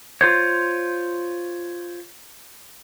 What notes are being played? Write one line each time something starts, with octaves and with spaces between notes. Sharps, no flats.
F4 C5 C#5